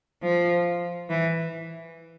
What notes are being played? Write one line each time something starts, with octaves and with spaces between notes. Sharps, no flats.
F3
E3